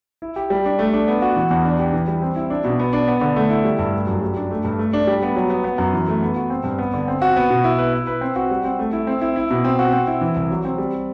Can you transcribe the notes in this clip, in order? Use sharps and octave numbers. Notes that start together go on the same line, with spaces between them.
E4
G4
G3
D4
A3
D4
B3
F#4
E3
E2
D4
G4
E3
G3
C4
E4
D4
B2
B3
D4
B3
D3
A3
E4
G3
G2
A3
F#2
G3
D4
A3
G2
A3
D4
G3
B3
F#3
B3
B3
F#2
E3
A3
B3
F#4
C4
G2
B3
D3
C4
F#4
B3
B2
E4
B4
E4
B4
C4
F#4
G3
C4
A3
E4
C4
E4
E4
B2
C4
F#4
C4
E4
E3
C2
F#3
C4
G3